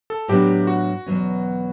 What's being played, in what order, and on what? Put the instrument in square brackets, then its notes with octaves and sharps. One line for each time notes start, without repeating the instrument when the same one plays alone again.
[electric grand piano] A4
[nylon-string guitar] A2 F#3 B3 D4 [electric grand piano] G4
[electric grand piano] F#4
[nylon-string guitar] E2 B2 F#3 C#4